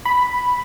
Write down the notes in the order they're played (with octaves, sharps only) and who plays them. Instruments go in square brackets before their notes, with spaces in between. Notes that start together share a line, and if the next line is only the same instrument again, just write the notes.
[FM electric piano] B5